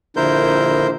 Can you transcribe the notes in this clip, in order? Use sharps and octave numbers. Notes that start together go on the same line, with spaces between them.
A#1 D3 E4 A#4 C5 G6